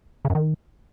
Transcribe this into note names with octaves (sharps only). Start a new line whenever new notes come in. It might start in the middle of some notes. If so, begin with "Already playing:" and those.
C#3
F#2
D#3